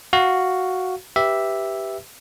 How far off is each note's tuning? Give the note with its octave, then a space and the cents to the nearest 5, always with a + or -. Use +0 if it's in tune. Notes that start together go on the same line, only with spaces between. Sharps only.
F#4 +0 F5 +0
G4 +0 B4 +0 E5 +0